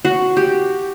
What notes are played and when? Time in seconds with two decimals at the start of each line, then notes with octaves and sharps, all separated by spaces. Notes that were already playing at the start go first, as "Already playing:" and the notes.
0.05 F#4
0.37 G4